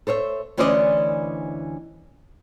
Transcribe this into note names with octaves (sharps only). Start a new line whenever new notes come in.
A4 C5 C#5 E5
D2 E3 C#4 C5 D5 D#5